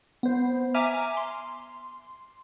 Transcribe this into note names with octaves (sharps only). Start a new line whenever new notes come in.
B3 C5
E5 G#5 A#5 D6 F6
C6